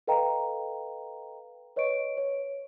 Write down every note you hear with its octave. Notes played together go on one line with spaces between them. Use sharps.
A4 B4 D#5 F5 G5 A#5
B4 C#5 D#5 C#6 D7
C#5